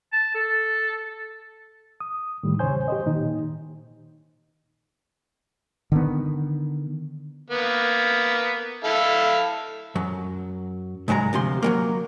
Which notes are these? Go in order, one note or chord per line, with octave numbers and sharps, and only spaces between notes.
A5
A4
D#6
A2 D#3 G3
E2 C#3 C5 C#5 G#5 G6
G4 C5 D#5
A#2 D#3 D#4
D3 D#3 B3
A#3 B3
E4 A4 F5
F#2 F#3
C2 G#2 F#3 G#3 A#5
D2 C3 F3 C6
F#3 G#3 A#3